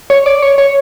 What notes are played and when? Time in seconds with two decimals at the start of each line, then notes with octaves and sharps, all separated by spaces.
0.10 C#5
0.26 D5
0.42 C#5
0.58 C#5